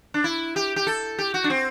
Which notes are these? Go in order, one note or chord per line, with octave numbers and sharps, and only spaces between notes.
D4
E4
G4
G4
A4
G4
F#4
D4
C4